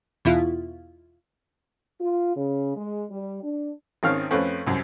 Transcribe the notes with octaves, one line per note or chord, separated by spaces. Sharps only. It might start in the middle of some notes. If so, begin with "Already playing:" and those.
E2 B2 E4 F4
F4
C#3
G#3
G3
D4
G#1 D#3 C4 C#4 F5 F6
F2 A3 C4 C#4 B4
C2 F#2